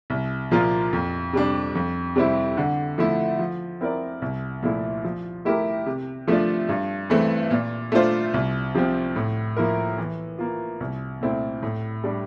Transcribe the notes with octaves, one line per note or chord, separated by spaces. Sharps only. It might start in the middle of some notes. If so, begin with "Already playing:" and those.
C2
A#2 F3 A#3 F4
F2
C3 G3 D4
F2
C3 G3 C4 E4
D3
F3 A3 E4
F3
C4 E4 A#4 D5
C2
A#2 F3 A3 E4
F3
A3 E4 G4 A#4
C3
F3 A3 D4 F4
G2
E3 A3 C4
A#2
A3 D4 F4 C5
C2
C3 F3 C4
A2
F3 A#3 E4 A#4
E3
A#3 F4
C2
A#2 A3 C4 E4
A2
G3 D4